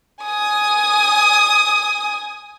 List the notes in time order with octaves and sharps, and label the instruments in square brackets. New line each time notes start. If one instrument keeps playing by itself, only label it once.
[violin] G#5 D#6